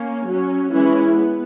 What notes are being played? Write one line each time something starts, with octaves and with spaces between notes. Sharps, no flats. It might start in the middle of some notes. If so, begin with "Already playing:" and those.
Already playing: A#3 C#4
F#3 C#4
E3 G#3 C#4 E4
B3